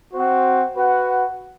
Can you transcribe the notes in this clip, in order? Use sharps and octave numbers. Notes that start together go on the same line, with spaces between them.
C4 F#4 C5 F#5
F#4 B4 F#5